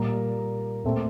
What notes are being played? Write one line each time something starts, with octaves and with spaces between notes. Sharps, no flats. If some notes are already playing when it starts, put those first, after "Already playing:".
Already playing: A#2 G3 A#3 A#5
A#2 A3 C4